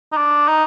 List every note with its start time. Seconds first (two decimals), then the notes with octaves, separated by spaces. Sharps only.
0.12 D#4
0.17 D4
0.48 D#4